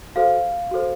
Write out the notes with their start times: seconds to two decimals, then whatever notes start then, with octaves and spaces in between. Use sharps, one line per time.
0.16 F#4 A4 C5 F5
0.71 F#4 A4 C5